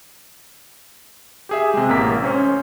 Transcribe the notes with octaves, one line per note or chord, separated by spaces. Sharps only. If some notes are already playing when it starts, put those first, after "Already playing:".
G4 G#4 E5
C3 G#3
A1 A#3 A#4 E6 B6
C#4 C5 C#5